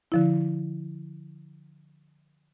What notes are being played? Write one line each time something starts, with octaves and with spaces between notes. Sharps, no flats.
D3 F3 E4